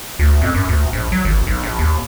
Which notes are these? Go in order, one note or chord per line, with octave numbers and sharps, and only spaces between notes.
D2
F2
F#2
D2
A#1
F#3
G#1
B1
A#1
D#2